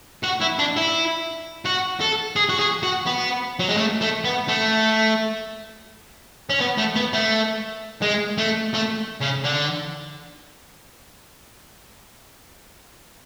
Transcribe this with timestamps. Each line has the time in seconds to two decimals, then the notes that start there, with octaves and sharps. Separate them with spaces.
0.23 F#4
0.40 E4
0.59 D4
0.77 E4
1.65 F#4
2.00 A4
2.36 G#4
2.49 F#4
2.59 G#4
2.83 F#4
3.06 B3
3.59 F#3
3.69 G#3
3.77 A3
4.01 A3
4.24 B3
4.48 A3
6.50 C#4
6.61 B3
6.78 A3
6.96 B3
7.13 A3
8.02 G#3
8.38 A3
8.73 A3
9.20 C#3
9.44 D3